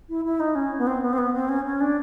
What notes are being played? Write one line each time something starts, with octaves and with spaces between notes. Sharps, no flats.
E4
E4
D#4
C#4
B3
C4
B3
C4
B3
C4
C#4
C#4
D4